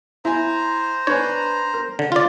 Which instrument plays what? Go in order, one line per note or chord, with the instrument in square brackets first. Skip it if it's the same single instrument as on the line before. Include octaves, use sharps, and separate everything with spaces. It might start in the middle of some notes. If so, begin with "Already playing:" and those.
[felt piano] E4 G#5 [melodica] C5 A#5
[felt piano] D4 B4 G#5 [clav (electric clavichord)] C#5
[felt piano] A#4
[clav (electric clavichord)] D3
F4 D5